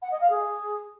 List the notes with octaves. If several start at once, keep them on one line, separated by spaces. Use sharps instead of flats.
F#5
D#5
F5
G#4